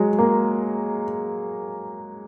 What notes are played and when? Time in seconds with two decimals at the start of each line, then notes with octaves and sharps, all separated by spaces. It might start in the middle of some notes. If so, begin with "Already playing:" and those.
Already playing: F#3 G#3
0.18 A#3